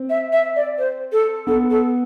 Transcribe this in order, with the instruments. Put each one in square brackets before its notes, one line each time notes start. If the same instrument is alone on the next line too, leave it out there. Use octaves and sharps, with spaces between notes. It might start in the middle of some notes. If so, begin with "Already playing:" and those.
Already playing: [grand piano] C4
[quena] E5
E5
D5
C5
A4
[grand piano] B3 [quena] A4
[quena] A4